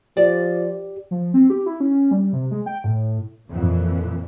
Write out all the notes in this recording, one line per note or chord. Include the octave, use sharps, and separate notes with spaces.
F3 G4 D5
F3
C4
G4
E4
C#4
G3
C3
G#3
G5
A2
F2 A#2 E3